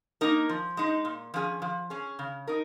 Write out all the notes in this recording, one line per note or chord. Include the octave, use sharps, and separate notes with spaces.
A#3 D#4 A#4
F3
G#3 D#4
A#2
F3 C#4 G#4
F3
C#4 G#4
C#3
D#4 A#4